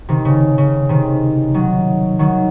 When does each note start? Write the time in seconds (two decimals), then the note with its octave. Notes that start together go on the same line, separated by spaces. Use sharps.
0.09 C3 D#3
0.25 C#3
0.58 C#3
0.89 C3 D#3
1.54 D#3 F#3
2.19 D#3 F#3